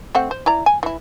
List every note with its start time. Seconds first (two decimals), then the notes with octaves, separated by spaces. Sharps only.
0.15 A3 C4 F#5
0.31 C5
0.46 E4 D5 A#5
0.66 G#5
0.83 E3 E4